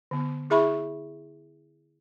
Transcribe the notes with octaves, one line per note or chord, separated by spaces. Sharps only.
D3 B3
E4 G#4 E5 B5 C#6